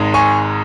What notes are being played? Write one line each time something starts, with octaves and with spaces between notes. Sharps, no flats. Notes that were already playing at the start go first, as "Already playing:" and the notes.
Already playing: G#1 G#2 G#3
G#5 C#6